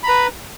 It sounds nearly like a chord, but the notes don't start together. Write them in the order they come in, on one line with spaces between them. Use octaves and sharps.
B5 A#5 B4